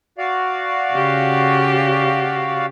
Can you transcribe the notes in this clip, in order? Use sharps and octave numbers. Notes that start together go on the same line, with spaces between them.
F#4 D5 F5
C#3 G4